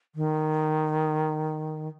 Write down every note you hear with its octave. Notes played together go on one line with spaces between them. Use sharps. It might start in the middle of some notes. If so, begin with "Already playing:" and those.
D#3